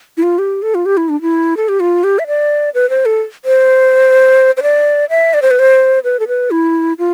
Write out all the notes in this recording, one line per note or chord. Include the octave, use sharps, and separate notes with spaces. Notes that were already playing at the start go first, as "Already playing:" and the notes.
E4
F4
G4
A4
F4
G4
E4
D4
E4
A4
G4
F4
G4
E5
D5
B4
C5
A4
C5
C5
D5
E5
D5
C5
B4
C5
B4
A4
B4
E4
F4